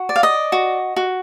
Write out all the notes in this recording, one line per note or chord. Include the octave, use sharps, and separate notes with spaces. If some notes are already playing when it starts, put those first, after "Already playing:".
Already playing: F#4
D5
F5
D#5
F#4
F#4